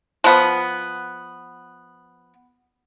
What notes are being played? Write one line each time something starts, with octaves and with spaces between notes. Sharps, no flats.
F3 B3